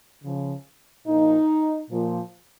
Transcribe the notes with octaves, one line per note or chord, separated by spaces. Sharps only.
C#3 F3
A#2 F3 D#4
A#2 F3